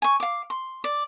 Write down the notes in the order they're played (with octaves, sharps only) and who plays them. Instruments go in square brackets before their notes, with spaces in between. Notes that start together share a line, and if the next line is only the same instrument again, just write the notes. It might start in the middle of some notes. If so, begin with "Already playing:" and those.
[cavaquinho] G#5 C#6
F5 D6
C6
D5